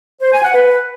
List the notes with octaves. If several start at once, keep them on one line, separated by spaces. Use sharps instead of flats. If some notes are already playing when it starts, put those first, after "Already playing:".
C5
G#5
F#5
B4